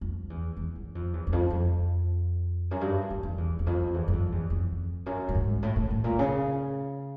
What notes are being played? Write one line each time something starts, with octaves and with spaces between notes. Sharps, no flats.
F2
E2
E2
F#2
F2
E2
E2
F2
F2
F#2
G2
F2
F2
E2
E2
F2
E2
F#2
F2
E2
F2
F#2
A2
G#2
A2
A2
A2
A#2
C#3